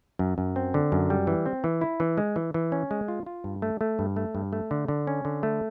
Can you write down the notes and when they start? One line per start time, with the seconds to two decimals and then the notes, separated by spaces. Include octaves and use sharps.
0.19 F#2
0.38 F#2
0.56 C4
0.74 D3
0.92 F#2
1.10 G3
1.27 E3
1.46 C4
1.64 E3
1.81 E4
2.00 E3
2.18 G#3
2.36 E3
2.54 E3
2.72 C#4
2.91 G#3
3.08 F4
3.26 F4
3.44 G2
3.62 A3
3.81 A3
3.99 G2
4.16 A3
4.35 G2
4.53 A3
4.71 D3
4.88 D3
5.07 C#4
5.25 D3
5.43 A3